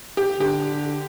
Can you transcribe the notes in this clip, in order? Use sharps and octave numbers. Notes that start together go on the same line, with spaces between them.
G4
D3 G4